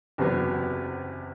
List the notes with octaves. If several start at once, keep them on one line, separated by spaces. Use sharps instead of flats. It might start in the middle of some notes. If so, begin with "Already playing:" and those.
F#1 E2 C3 F#3 B3